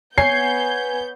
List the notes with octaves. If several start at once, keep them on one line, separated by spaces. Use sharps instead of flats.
B3 C#5 G#5 G6 G#6 C7